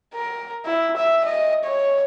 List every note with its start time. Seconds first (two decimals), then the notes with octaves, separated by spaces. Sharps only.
0.15 A#4
0.65 E4
0.97 E5
1.25 D#5
1.64 C#5